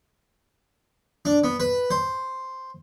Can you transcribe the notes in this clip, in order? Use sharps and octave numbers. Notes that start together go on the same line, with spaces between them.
D4
B3
B4
C5